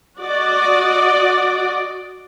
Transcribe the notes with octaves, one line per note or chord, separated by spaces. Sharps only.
F#4 D5 D#5